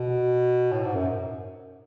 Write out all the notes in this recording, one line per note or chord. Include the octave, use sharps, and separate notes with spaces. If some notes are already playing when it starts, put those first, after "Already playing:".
Already playing: B2
A2
G#2
F#2